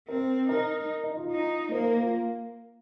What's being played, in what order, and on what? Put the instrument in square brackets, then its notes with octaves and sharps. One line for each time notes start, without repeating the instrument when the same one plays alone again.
[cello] C4 [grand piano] A#4
[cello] D#4 [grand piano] A#4
[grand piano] D#4
F4
[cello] D#4
[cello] A#3 [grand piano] C5
[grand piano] A#4
F4